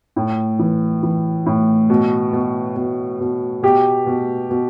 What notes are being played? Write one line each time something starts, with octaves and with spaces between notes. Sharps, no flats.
A2
E3
E3
A2
B2
B2
B2
B2
B2 G4
B2
B2